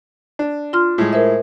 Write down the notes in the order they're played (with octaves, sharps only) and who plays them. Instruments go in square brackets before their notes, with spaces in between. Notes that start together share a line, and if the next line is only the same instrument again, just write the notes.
[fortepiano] D4
[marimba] F4 C6 F6
[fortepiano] A2 G#3
[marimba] A#4 C5 E5